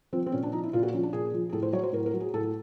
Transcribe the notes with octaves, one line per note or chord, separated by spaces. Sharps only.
F3 C4
C4
A#2 C#4
D4
F3 D#4
E4
A#2 F4
F#4
F3 C#4
D4
A#2 G#4
F3
G#4
A2 A4
C5
F#3 C#5
C5
A2 A#4
A#4
F#3
G#4
A2 A4